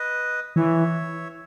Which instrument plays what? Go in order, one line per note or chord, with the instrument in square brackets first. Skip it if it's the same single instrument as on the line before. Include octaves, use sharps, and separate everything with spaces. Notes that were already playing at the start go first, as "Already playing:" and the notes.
Already playing: [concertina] B4 D#5
[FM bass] E3 [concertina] C#5 E5